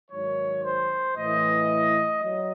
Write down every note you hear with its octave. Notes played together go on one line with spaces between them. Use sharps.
G#2 D#3 F#3 C#5
C5
A2 E3 D#5
F#3 D#5